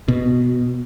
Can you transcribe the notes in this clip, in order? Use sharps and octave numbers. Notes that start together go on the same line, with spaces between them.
B2